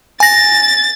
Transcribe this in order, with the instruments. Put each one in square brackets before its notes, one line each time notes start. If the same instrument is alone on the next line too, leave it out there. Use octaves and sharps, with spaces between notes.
[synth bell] G#5 A#6 [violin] A6